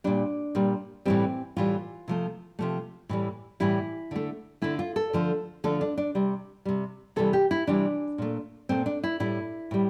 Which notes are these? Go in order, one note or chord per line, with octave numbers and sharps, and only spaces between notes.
A#2 G3 D4
A#2 G3
A2 E3 G3 C4
A2 E3 G3 F4
C3 F3 A3
C3 F3 A3
A2 E3 G3
A2 E3 G3 E4
D3 A3
D3 A3 E4
F4
A4
D3 F3 A3
D3 F3 A3 A4
D4
D4
C3 G3
C3 G3
C3 E3 G3 A4
G4
E4
C3 E3 G3 D4
A#2 A3
A#2 A3 C4
D4
E4
A2 G3 E4
A2 G3